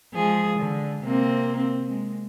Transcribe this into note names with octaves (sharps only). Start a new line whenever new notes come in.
F3 G#3 G#4
D3
C3 A#3 C4
C4
G#3